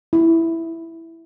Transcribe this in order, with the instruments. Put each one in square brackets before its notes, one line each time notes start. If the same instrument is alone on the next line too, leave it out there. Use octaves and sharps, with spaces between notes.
[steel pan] E4